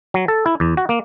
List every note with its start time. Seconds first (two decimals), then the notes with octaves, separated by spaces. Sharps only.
0.14 F#3
0.28 A4
0.46 E4
0.60 E2
0.77 F#4
0.89 A#3